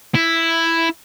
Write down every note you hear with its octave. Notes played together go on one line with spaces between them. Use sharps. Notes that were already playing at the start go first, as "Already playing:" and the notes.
E4